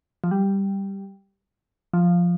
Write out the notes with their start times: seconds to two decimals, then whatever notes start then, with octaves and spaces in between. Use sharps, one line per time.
0.24 F3
0.31 G3
1.93 F3